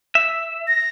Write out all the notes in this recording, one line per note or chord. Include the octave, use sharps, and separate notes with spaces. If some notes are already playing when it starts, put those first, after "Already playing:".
E5
A#6